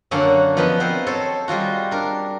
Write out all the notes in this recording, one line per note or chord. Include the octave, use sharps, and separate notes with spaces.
F#2 D3 A#3 C#4 A4 F#5
F3 B3 F4 B4 D#5
B3 C4 A#4 C5
A4 C5 C#5 A5
G3 G#3 F4 F#4
D4 A#4